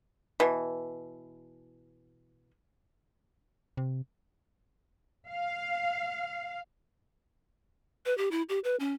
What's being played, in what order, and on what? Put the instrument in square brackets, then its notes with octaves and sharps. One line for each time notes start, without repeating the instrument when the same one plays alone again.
[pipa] B2 E3
[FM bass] C3
[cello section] F5
[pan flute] B4
G4
E4
G4
B4
C#4